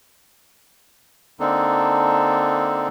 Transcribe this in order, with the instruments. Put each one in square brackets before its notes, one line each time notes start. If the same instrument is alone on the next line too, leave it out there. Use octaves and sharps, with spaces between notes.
[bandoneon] D3 A#3 C4 D4 D#4 A4